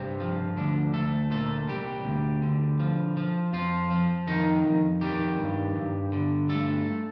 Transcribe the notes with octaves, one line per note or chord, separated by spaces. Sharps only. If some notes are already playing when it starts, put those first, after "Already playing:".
Already playing: G2 C3 C4
F3
D2 D3 D4
D2 A3 A4
A#2 A3 A4
C2 G3 G4
D2
D3
F3
F3
F2 F3 F4
F3
F2 D#3 D#4
F2
D#3 G3 G4
G2
G2
D3
G2 A3 A4